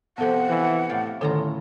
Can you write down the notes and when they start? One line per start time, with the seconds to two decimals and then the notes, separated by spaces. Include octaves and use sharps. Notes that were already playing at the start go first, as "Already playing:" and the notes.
0.18 C3 F3 B3 G4 A4 F#5
0.50 E3
0.89 A2 D5 F5 G5
1.21 F#2 A2 D3 D#3 F4 A4 A#5